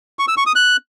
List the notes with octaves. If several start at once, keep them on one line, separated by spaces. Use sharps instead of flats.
C#6
E6
C#6
D#6
F#6